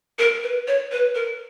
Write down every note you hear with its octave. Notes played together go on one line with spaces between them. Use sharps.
A#4
B4
C#5
B4
A#4